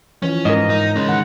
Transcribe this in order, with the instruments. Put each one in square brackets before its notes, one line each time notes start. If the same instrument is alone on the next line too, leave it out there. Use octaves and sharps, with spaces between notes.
[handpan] E3 F3 [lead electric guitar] C#4
[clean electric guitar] G#2 [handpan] A#4 D#5
[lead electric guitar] D#4
G#3 C#4
[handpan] D#3 F#5